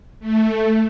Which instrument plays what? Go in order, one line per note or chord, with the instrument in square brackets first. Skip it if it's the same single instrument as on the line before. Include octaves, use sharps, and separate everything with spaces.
[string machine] A3